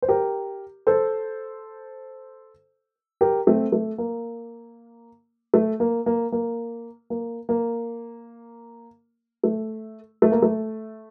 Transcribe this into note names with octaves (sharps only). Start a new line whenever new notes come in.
C5
G4 A#4
A4 C5
G4 A#4
A3 C4
A3
A#3
A3
A#3
A#3
A#3
A#3
A#3
A3
A3
A#3
A3